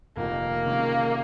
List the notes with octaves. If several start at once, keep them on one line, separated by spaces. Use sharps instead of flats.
F1 F2 D#3 A#3
C3 D#3 G#3 C#4 F4